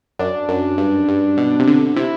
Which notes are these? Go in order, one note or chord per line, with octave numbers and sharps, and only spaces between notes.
F#2 D4
F#2
G2
G2
B2
C3
D3
C3 E4